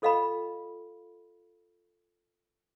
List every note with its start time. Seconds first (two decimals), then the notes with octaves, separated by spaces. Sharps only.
0.02 F4 A4 D#5 F5 G5 B5